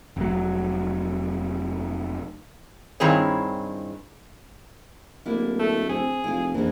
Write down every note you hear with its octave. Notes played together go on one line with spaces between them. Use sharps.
F1 F#3
G2 D#3 C4 E4 G#4 C#5
D1 A#3 D4 E4
A3
C4 G#4
F1 E4 F4
A#1 F2 E3